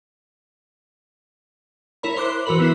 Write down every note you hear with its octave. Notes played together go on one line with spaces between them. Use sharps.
E4 A#4 C#5 B5
C5 C6 D6 F#6
C6
E3 F#4 A#4 B4 B5 F#7
B3 E4 C7